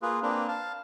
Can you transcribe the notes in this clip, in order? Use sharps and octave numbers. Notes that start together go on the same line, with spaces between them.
A#3 F4 G#4 B4
A#3 C4 D4 B4
F5 A5